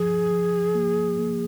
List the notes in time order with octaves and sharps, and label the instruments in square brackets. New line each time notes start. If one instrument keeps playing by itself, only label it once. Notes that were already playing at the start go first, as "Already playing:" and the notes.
Already playing: [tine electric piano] F3 [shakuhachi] G#4
[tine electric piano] F3
A#3
A#3